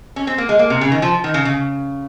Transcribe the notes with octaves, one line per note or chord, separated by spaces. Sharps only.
C#4
C4
A#3
G#3
A#3
C3
C#3
D#3
F3
D#3
C#3
C#3